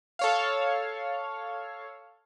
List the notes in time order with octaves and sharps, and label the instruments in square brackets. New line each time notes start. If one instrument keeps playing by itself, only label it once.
[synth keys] A4 C#5 F5